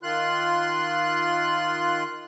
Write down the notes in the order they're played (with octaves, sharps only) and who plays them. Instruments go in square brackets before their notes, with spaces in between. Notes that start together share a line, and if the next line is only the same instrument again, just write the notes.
[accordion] D#3 F4 C6 F#6